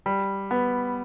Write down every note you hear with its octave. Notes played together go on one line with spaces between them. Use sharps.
G3
B3